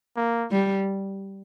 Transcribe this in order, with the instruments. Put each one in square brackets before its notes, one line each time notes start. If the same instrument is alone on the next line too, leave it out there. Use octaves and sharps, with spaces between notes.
[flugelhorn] A#3
[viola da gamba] G3